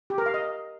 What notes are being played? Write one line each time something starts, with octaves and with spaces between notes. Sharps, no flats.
G4
A#4
F5
D#5